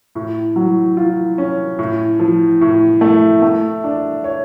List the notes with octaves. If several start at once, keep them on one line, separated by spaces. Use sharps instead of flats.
A2
F#3
F4
C#4
A2
F3
A2
A3
A3
D4
C#5